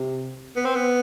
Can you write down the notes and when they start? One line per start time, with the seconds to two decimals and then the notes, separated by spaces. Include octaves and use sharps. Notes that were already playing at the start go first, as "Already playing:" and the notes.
Already playing: C3
0.56 B3
0.65 C4
0.75 B3